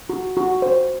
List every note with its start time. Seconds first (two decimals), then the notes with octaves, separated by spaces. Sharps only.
0.10 F#4
0.37 F#4
0.62 C5